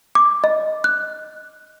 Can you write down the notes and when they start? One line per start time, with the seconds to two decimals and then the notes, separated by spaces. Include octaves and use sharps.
0.15 D6
0.44 D#5
0.84 F#6